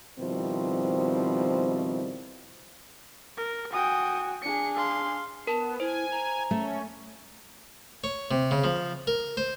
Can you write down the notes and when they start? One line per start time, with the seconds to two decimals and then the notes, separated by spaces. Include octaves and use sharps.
0.19 B2 D#3 F3 G3 C4 E4
3.37 A#4
3.72 F#4 G5 G#5 D#6
4.42 D4 G#4 C#7
4.76 F5 C6
5.47 B3 A#4 A5
5.80 E4 C5 G#5
6.11 A#5
6.51 A3 C#4
8.04 C#5
8.31 C3
8.51 C#3
8.64 F3
9.07 A#4
9.37 C5